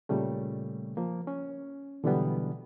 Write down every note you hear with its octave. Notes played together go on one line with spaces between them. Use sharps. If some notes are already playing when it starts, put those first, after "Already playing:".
A#2 C#3 G3 A3
F3 A#3
C#4
B2 D3 E3 F#3 G3 B3